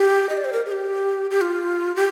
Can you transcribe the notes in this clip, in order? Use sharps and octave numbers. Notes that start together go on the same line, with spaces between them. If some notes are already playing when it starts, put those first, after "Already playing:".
Already playing: G4
D#5
D5
C5
A#4
G#4
G4
G4
F4
G4